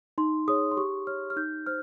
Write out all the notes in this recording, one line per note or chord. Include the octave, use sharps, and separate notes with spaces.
D#4 C6
G#4 C#5 D#6
C6
G4 C#6
C#5 F6
F6
D#4 G6
C5 F6